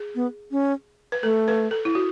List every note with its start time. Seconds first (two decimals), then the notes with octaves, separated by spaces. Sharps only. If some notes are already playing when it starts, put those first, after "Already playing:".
Already playing: G#4
0.15 B3
0.52 C#4
1.12 B4
1.23 A3 A4
1.48 B4
1.71 A4
1.85 E4
1.95 F#4